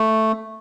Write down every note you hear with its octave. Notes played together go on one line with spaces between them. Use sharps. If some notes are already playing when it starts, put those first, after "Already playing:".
Already playing: A3